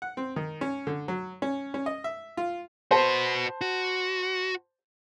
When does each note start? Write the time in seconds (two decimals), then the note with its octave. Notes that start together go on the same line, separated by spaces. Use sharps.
0.02 F#5
0.17 C4
0.36 D#3
0.61 C#4
0.87 D3
1.08 F#3
1.42 C#4
1.74 C#4
1.86 D#5
2.04 E5
2.37 F4
2.91 F#4 B4 C5 A5
3.61 F#4